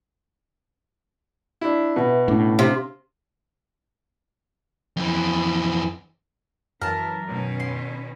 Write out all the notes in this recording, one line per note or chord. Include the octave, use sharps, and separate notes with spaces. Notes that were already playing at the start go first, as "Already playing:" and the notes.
D4 E4
B2 B4 E5
A2 C#4 D4
C3 F5
F2 E3
F#2 E3 A#4 A5
B2 D#3 C#4
C6